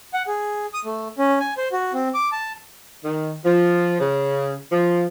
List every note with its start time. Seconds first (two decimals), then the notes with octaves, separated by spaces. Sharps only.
0.14 F#5
0.27 G#4
0.74 D#6
0.85 A3
1.18 C#4
1.40 G#5
1.58 C5
1.72 F#4
1.93 C4
2.14 D6
2.32 A5
3.04 D#3
3.45 F3
4.00 C#3
4.72 F3